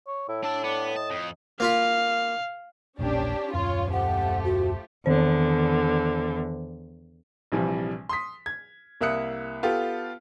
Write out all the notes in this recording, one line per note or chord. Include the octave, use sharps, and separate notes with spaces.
C#5
A2 E4
D4 A4 A5
B3 D4
D#5 A5
F2
A#3 F4 F5 B5
E1 A#1 A#2 C#4 D4 G4
D#1 F#2 C#4 F4 C#5
F3 A3 G4 F#5
F#4
E2 D3 D#3 C5
A#1 C3 E3 F3 G3
C6 D#6 B6
G#6
C2 A#3 E5 D#6 F#6 C#7
B3 F4 G4 A4